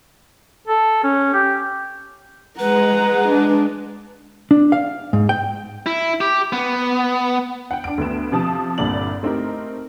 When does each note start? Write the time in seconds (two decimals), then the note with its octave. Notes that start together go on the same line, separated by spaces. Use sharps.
0.67 A4
1.04 C#4
1.33 G4
2.59 G#3 B4 F#5 A#5
3.28 D4
4.51 D4
4.72 F5
5.13 G#2
5.29 G5
5.86 E4
6.21 G4
6.53 B3
7.71 F#5 G5
7.84 D4 D7
7.98 D2 A3 B3 E7
8.32 C3 F3 A5 D#6 E7
8.78 G1 C2 A#2 D5 F#7
9.23 A3 C4 D#4 G4 A#4